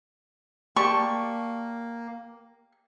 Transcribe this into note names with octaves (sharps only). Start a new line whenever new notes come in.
A#3 G4 D5 A5 C#6